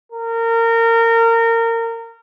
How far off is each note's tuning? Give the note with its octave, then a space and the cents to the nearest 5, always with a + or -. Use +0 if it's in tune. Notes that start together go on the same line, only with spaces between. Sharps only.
A#4 -25